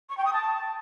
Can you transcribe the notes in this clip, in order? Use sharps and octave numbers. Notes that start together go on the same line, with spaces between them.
C#6
G5
D#6
A5